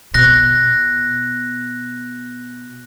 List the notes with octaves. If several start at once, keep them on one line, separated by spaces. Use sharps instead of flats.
B2 F#6 A#6